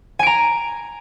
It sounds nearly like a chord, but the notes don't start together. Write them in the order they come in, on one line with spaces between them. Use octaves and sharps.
G#5 D7 A#5